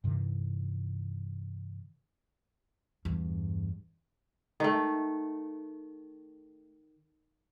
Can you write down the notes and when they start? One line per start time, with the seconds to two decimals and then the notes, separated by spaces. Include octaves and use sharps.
0.04 G2 C3 D#3 E3
3.05 E2 G2
4.60 D#3 A3